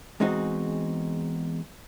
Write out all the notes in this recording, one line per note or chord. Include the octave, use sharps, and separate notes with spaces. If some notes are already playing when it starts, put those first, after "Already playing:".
E2 G#3 C4 D#4 F#4